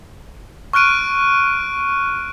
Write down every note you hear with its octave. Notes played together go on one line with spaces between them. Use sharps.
C#6 F6 F#6 D7 D#7